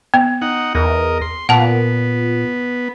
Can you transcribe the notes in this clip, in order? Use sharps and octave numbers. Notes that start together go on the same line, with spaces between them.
B3
D#4 F#5
E2 A#4 D#5
C6
A#2 B3 F#5 A5